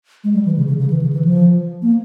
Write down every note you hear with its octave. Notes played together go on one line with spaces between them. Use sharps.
G#3
G3
E3
C#3
C#3
C#3
E3
C#3
E3
F3
A#3